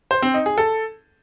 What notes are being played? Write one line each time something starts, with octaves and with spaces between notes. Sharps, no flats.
C5
C4
D#4
G#4
A4